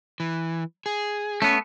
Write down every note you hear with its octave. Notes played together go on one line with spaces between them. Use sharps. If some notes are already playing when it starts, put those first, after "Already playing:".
E3
G#4
A3 B3 C#4